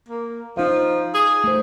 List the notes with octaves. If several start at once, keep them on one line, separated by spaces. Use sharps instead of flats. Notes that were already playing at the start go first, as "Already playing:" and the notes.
A#3
F3 D#4 F5
G#4
A3 C5